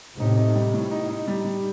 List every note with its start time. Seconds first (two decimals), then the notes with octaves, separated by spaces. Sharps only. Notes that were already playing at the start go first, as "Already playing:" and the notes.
0.19 A2 C3 D#4
0.37 D#4
0.56 G3
0.74 A2
0.91 D#4
1.09 D#4
1.28 G3
1.44 G3